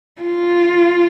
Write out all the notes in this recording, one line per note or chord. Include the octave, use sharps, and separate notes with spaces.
F4